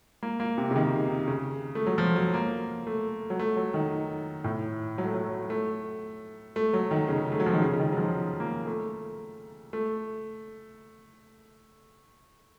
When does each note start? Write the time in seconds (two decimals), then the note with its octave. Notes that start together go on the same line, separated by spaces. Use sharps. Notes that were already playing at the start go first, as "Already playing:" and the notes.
0.23 A#3
0.40 A#3
0.58 C3
0.71 C#3
0.76 D#3
1.28 C#3
1.75 A3
1.86 F#3
1.98 F3
2.16 F#3
2.34 A#3
2.87 A3
3.30 F#3
3.39 A3
3.57 F#3
3.74 D#3
4.44 A2
4.98 F#3
5.05 A3
5.14 F#3
5.50 A3
6.56 A3
6.73 F#3
6.91 D#3
7.08 C#3
7.32 A3
7.40 F#3
7.46 F3
7.54 D#3
7.62 C#3
7.73 C#3
7.80 D#3
7.92 F#3
7.97 F3
8.40 A#3
8.67 A3
9.73 A3